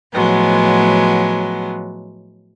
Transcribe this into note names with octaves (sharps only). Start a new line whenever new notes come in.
A2 F3 F#3 G#3 B3